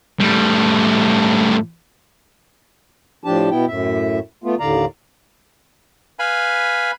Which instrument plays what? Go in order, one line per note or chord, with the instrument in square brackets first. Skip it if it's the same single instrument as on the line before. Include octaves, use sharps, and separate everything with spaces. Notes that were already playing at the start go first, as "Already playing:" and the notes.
[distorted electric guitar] A2 G3
[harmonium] A2 F3 D4 G4 A5
B2 B3 E4 G5
F#2 A2 E5
A3 B3 F4
D#2 A2 D3 D5 F5 A#5
[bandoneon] B4 F5 G#5 B5